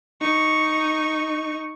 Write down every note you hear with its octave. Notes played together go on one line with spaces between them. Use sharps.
D#4 C#6